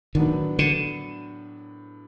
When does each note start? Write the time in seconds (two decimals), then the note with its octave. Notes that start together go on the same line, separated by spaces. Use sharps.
0.15 A2 D#3 F#3 B3 D4
0.59 D3